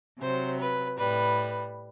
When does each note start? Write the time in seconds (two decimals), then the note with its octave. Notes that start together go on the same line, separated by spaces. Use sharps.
0.19 C3 F#3 C5
0.59 B4
0.97 A2 G3 B4